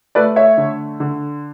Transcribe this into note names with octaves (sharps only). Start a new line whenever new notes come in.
A3 B4 D5
C#5 E5
D3
D3